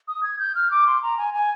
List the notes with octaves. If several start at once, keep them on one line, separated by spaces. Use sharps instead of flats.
D#6
G#6
G6
F6
D6
C6
A#5
G#5
G#5